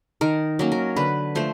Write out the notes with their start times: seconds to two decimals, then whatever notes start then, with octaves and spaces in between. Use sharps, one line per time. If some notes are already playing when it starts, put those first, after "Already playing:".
0.21 D#3 A#4
0.59 F#3 A#3 C#4
0.72 A#4
0.96 D3 B4
1.35 F3 A3 C5